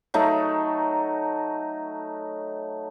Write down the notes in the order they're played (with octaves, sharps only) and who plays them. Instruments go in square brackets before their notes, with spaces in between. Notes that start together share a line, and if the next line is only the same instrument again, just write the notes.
[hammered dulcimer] F#3 A3 D#4